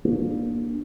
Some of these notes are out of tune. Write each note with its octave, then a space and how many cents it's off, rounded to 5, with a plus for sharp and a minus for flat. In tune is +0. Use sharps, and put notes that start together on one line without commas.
A#3 +20 D4 +10